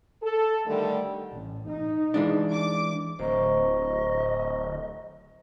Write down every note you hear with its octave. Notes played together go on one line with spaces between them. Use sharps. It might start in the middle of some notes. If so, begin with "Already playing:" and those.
A4
D3 D#3 G3 A3
A1
D#4
E3 G#3 D4
D6
D1 C5 D#5 A#5 C#6